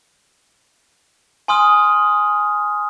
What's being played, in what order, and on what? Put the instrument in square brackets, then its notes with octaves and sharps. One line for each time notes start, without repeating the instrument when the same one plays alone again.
[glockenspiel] G#5 C6 D#6 F6